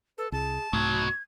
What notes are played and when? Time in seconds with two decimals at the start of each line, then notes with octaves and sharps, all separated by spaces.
0.18 A4 B4
0.32 C2 G#4 A5
0.73 C2 G#2 B2 F#3 A3 G#6